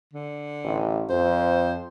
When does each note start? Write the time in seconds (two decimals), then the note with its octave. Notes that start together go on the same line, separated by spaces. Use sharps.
0.13 D3
0.64 A1
1.10 F2 C5